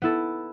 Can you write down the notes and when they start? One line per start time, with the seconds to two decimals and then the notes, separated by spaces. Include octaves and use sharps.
0.02 B3 E4 A4